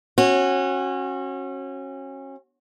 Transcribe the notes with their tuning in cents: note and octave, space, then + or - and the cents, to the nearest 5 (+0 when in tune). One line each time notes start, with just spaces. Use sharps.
C#4 -30 F#4 -5